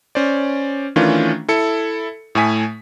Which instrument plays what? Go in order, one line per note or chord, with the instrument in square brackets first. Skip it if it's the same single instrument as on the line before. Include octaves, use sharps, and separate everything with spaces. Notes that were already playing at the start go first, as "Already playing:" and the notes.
[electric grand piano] C#4 C5 D5
D#3 E3 A3 C#4 D4 F4
E4 A4 C#7
A2 A3 G#5 B6